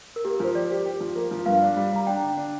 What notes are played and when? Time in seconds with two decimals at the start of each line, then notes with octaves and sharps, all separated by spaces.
0.16 A#4
0.25 A#3 G4
0.35 A#4
0.40 F3 C5
0.55 G4 D5
0.71 G4
0.86 G4
1.00 F3
1.16 A#3
1.31 F3
1.46 G2 F5
1.62 D4
1.76 G3
1.92 G3 A#5
2.07 D4 G5
2.23 D3
2.37 D4